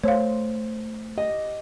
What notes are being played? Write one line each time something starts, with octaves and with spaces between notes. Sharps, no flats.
A3 C5 C#5 F5
G4 D#5